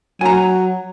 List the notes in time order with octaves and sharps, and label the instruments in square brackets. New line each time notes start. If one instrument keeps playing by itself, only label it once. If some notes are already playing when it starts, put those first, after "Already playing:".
[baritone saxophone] F#3 [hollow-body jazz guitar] G#5 A#5